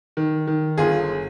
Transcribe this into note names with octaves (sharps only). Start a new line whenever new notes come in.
D#3
D#3
G1 F4 G#4